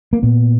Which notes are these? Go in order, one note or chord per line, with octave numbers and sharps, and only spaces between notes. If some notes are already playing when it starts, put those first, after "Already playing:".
A#3
A#2 B3